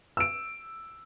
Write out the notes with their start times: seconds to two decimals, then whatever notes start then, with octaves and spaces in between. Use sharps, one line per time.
0.17 E6 D7